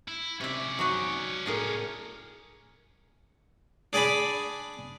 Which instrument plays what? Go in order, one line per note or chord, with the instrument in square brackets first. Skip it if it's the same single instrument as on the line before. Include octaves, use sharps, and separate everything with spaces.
[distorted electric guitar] E4
[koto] C3 E5 [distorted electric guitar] C#4 D5
[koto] F#3 D#4 F#4
A2 G#4 A#4
[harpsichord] D4 G#4 D5 G#5 B5